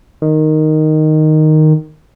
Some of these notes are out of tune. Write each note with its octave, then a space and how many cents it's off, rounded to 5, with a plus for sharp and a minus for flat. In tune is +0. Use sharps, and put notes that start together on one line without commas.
D#3 -5